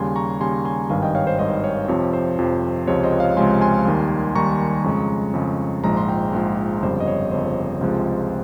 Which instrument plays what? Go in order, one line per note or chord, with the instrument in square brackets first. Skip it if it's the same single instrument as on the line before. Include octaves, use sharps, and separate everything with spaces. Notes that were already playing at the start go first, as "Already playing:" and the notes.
Already playing: [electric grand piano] D#2 C#3 G3 G#5 C6
A#5 C#6
D#2 C#3 G3 G#5 C6
G#5 C6
G#1 G2 D#3 F5 G#5
D#5 G5
C#5 F5
C5 D#5
G#1 G2 D#3 C5 D#5
C#5
F2 C3 F3 C#5
C5
F2 C3 F3
C#2 C3 F3 G#3 C#5
C5 D#5
C#5 F5
C#2 C3 F3 G#3 G#5 C6
G#5 C6
D#2 D#3 G3
D#2 D#3 G3 A#5 C#6
F2 C#3 G#3
F2 C#3 G#3
A#1 G#2 F3 G#3 A#5
C6
G5 A#5
A#1 G#2 F3 G#3
G1 F2 C#3 G3 C5
D#5
C#5
G1 F2 C#3 G3 C5
C#2 C3 F3 G#3